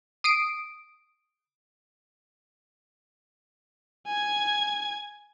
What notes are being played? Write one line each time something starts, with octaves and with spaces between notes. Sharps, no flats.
D#6 C7 D7 D#7
G#5 G#6